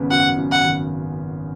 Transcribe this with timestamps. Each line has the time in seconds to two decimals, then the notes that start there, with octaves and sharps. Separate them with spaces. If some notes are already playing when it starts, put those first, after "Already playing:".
Already playing: G#1 C#3 B3
0.10 F#2 F#5
0.38 F#2
0.52 F#5
0.65 G#1